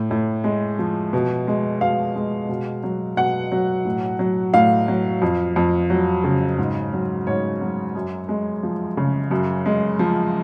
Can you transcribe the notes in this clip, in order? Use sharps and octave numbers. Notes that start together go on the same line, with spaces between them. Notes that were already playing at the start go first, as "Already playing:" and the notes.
Already playing: A2
A2
G#3
F3
B2
G#3
B2 F5
G#3
B2
F#3
B2 F#5
F#3
A2
F#3
A2 F5
F#3
F2
F2
F#3
C#3
G#2
F#3
G#2 C#5
F#3
F#2
G#3
F3
C#3
F#2
G#3
F3